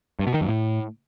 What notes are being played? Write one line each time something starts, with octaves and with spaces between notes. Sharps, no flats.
G2
B2
D#3
F#2
A2